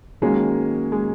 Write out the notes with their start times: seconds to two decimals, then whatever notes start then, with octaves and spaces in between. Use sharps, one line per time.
0.22 D#3 F#3 G#3 A#3 C#4
0.92 G#3